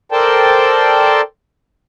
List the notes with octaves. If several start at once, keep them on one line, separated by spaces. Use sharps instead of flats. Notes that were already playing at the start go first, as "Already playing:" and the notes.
A4 A#4 C5 D5 G5 A5